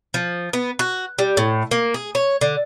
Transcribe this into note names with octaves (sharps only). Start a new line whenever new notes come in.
F3
B3
F#4
G3
A2
A#3
G#4
C#5
D3